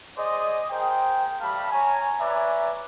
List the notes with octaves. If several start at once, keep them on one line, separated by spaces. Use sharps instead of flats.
G#4 C5 D5 D#5
G#4 A#4 C5 G5
G3 A3 F5 A5 B5
C#5 G#5 A#5
B4 C#5 D5 E5 G#5 A#5